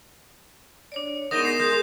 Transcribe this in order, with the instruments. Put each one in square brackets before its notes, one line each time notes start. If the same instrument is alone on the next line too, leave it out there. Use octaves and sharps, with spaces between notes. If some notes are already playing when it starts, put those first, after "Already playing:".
[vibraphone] D4 C#5 D5
[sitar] G#2 D#4 [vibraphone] B3 A#4 [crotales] D#6 A#6 E7
[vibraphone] A#4 [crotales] C7
[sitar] G#3 [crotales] D#6 G6